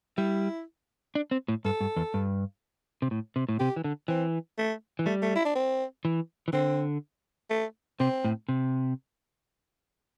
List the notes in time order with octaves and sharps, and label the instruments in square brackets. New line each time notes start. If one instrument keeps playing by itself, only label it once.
[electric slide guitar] G3 [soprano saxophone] E4
[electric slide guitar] D4
C4
A2
[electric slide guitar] G2 [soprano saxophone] A4
[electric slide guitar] G2
E2
G2
C3
A2
C3
A2
[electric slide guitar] C3 [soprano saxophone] G4
[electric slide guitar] E3
D3
[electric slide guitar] E3 [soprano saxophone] C4
[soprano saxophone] A3
[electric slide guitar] E3
[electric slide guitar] G3 [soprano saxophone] A3
[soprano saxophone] A3
E4
D4
C4
[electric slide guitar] E3
E3
[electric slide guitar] D3 [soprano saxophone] C4
[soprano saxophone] A3
[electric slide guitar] C3 [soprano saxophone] C4
[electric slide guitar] A2
C3